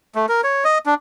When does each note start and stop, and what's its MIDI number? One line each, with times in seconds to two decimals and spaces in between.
0.15 0.26 57
0.29 0.41 70
0.44 0.64 73
0.64 0.78 75
0.86 0.94 62